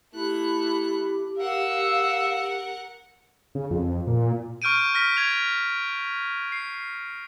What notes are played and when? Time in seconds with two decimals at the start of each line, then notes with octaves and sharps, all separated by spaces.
0.14 A3 E4 G4 F#6
1.38 A#4 F5 F#5 E6
3.55 C#3
3.71 F2
4.07 A#2
4.62 C#6 F6 G6 D7 D#7
4.94 F6 A#6 B6
5.17 G#6 F7
6.52 C7